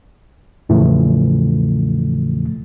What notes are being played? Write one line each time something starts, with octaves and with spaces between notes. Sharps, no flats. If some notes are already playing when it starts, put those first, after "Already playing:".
E2 A2 C#3 E3 F3 A3